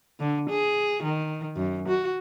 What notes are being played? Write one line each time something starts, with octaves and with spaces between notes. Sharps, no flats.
D3
G#4
D#3
F#2
F#4